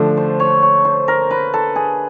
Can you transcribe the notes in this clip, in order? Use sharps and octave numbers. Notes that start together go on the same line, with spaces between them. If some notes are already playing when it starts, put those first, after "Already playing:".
Already playing: D3 F3 A3 D4
C5
C#5
C#5
C5
A#4
B4
A4
G#4